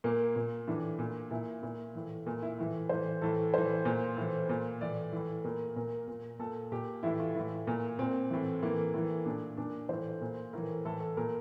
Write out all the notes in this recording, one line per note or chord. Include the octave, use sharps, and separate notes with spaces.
A#2 A#3
A#2
A2 E3 D4
A#2
A#2 E4
A#2 E4
A2 E3
A#2
E4
A2 E3
A2 E3 C5
A2 E3 A4
A2 E3 C5
A#2
A2 E3
A#2
A2 E3 D5
A2 E3
A#2 A#4
A#2 A#4
A#2
A#2 A4
A#2 G4
A2 E3 E4
F4
A2 E3 E4
A#2
A#2 C4
A2 E3
A2 E3 A#3
A2 E3
A#2 D4
A#2 D4
A2 E3 C5
A#2
A2 E3 A#4
A2 E3 A4
A4
A#2 A#4